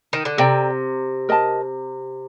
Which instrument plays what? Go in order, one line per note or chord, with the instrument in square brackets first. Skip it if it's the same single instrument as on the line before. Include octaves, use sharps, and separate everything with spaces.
[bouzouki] D#3
D3
[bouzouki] C3 [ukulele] A4 D5 G5 A#5
[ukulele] A#4 D#5 A5